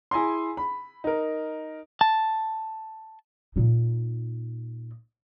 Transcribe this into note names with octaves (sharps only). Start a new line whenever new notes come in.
E4 G#4 G#5 A#5 C6
B5
D#4 A#4
A5
A#2 D#4